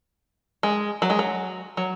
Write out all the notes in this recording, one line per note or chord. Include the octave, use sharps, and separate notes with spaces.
G#3
F#3
G#3
F#3
F#3